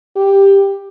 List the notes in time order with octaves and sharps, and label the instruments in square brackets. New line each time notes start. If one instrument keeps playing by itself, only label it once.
[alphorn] G4